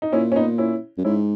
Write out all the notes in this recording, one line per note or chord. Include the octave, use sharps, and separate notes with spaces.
D#4
A#2 C#4 E4
C#4
B3 D#4
C#4 E4
F#2
G#2 C#4 E4